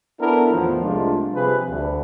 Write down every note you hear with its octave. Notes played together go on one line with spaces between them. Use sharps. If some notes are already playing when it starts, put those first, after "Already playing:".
B3 D4 E4 A4 A#4
E2 A2 D#3 F3 B3
C2 G#3 A3 D4 F4
C3 F3 G3 G#4 B4
D2